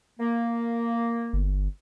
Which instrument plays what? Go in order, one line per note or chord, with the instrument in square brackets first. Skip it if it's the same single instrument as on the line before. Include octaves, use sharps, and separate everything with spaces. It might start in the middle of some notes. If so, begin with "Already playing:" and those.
[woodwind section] A#3
[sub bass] G1